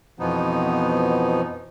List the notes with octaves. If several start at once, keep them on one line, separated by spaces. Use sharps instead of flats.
F2 B2 E3 F3 B3 D#4